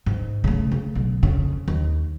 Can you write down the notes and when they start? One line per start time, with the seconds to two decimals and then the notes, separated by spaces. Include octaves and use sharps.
0.06 G#2
0.44 C#3 A3
0.72 C#3
0.95 B1
1.23 F2 C#3
1.68 D#2